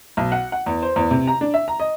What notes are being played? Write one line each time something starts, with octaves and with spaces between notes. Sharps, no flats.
B1
F#5
F#5
E2
C5
E2
C3
A#5
D4
E5
A#5
D#5